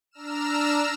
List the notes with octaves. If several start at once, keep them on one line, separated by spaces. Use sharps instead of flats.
D4 A#5 E6 F6 E7